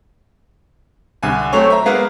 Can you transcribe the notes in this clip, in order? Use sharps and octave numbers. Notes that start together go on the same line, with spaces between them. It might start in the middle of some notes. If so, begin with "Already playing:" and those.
C2 D3 G#5
F#3 A3 C4 A4 C#5
E5 A#5
G#3 A#3 B3